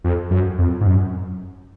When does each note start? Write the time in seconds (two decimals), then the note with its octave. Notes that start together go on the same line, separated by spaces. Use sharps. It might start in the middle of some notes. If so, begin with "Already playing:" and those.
0.04 F2
0.31 F#2
0.59 F2
0.81 G#2
0.87 F#2